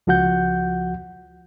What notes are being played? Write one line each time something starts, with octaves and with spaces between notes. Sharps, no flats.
C#2 F3 F#4 F#5 G6